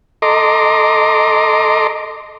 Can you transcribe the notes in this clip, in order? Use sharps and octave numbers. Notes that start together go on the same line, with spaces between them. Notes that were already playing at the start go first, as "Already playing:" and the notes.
A4 D#5 A#5 C6 D6